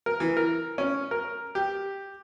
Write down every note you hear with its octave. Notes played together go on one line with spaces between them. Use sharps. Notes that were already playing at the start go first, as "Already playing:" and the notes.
A#4
E3
A#4
C#4
A#4
G4